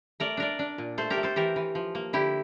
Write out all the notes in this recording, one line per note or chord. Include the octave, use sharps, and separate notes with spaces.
A3 A#4 D5
D4 A#4 D5
D4
A#2
A3 A4 C5
G4 A#4
A3
A4 C5
E3 G4 A#4
E3
F3
A#3
D3 E4 G4